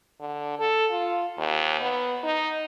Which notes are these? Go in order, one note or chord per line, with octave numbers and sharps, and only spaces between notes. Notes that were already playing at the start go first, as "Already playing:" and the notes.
D3
A4
F4
D#2
B3
D#4